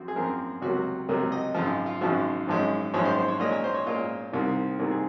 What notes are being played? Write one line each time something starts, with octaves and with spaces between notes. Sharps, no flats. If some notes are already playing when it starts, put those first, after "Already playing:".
Already playing: F#2 F3 C4 F#4
G#4
F#2 F3 C4 A#4
C#2 C3 F#3 A#3 F#4
C#2 C3 F#3 A#3 A#4
D#5
G#1 F#2 C#3 F3 F4
F4
G#1 F#2 C#3 F3 F#4
G#1 F#2 F3 G#3 C#4
G#1 F#2 F3 G#3 C#4 C#5
C5
C5
C#5
A#2 G#3 C#4 D#5
C#5
C5
C#5
A#2 G#3 C#4 F4
C2 C3 D#3 A#3
C2 C3 D#3 A#3 A#4
G#4